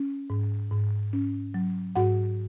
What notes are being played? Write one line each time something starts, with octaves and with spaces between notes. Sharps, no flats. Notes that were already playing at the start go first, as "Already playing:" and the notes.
Already playing: C#4
G#2
G#2
C#4
F#3
G#2 F#4 F#5